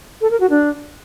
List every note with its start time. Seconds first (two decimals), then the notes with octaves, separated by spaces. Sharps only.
0.21 A4
0.31 A#4
0.40 F#4
0.50 D4